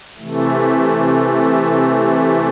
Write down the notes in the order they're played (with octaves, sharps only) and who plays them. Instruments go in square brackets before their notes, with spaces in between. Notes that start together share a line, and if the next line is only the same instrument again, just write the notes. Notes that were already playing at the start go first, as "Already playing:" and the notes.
[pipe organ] C3 E3 A3